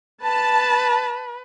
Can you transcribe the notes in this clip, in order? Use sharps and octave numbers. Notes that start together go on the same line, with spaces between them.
B4 A5